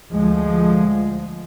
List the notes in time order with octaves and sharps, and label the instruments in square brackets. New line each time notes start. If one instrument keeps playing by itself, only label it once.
[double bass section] D2 F3 G#3